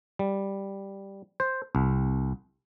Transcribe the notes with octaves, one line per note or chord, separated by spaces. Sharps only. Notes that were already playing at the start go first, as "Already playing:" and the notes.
G3
C5
C2